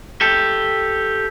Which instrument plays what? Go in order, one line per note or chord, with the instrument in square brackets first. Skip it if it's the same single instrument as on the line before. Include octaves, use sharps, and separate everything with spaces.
[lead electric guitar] G4 A4